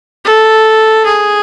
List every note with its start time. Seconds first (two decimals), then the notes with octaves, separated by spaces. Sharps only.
0.25 A4
1.05 G#4